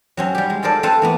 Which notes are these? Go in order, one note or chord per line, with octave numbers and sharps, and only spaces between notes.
F#3 C4 C#4
G3 G4
G#3
F4 A4 A#4 C5 D5
C4 A4 B4 C5 F5 A5
E3 A#3 B3